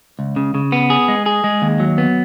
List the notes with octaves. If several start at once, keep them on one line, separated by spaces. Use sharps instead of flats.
C#2
C#3
C#3
B3
G#4
G#3
G#4
G#3
D#2
F#3
B3